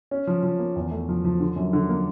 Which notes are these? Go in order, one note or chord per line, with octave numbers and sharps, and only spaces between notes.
C#4
F3
F3
A#3
E2
A3
F3
F3
D3
F#2
D3
A#3